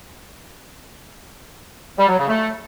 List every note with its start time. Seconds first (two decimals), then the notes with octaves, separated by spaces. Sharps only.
1.99 G3
2.09 F#3
2.19 C#3
2.28 A3